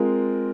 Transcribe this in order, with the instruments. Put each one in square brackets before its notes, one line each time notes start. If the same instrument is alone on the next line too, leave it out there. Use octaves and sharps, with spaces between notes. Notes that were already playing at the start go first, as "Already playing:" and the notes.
Already playing: [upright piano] G#3 C4 F4 A#4